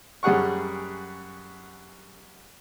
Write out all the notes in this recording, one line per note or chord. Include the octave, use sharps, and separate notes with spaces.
F#2 G3 G#4 F#5 C#6